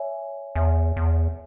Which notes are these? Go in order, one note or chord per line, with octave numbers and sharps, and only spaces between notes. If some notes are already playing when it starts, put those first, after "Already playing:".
Already playing: C#5 E5 G#5
E2 C#5 E5 G#5
E2